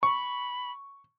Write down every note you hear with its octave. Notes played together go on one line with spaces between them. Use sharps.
B5 C#6